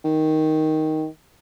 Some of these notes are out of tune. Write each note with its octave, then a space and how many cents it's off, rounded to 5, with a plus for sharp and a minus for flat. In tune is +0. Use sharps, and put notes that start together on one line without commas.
D#3 +5